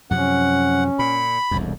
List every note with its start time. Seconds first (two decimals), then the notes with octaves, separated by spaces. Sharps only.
0.11 F#2 C3 F3 C#4 F#5
0.99 A#2 B5
1.51 E1 C2 F2